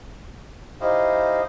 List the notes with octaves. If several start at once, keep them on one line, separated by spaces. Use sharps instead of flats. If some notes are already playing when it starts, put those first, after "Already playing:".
D#4 E4 G4 C5 D#5 F5